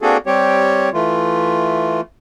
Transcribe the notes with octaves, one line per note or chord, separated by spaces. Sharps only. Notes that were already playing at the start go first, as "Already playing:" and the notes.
A#3 C4 D4 F#4 G#4 A4
G3 C4 G4 C#5
E3 A3 F4